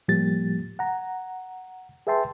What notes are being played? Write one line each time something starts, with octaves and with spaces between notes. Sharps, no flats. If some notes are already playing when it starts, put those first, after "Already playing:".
A2 F3 G3 A#3 G4 A6
F#5 A#5
G#4 B4 E5 G5 A5 C6